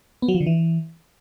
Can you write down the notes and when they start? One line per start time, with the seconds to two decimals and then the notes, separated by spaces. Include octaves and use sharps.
0.22 B3
0.28 F#3
0.34 F3
0.40 D3
0.46 E3